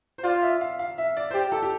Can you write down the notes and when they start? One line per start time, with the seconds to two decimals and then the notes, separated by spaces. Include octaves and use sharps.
0.18 C5
0.24 F4 D5
0.42 E5
0.61 F5
0.79 F5
0.98 E5
1.17 D5
1.31 C5
1.34 G4 D5
1.52 A4
1.62 G4